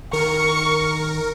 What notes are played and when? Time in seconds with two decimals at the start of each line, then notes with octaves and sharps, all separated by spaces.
0.13 D#3 A#4 C#6